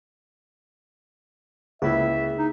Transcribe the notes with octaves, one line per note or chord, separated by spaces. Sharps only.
C#2 A#3 E4 G#4 E5
D#4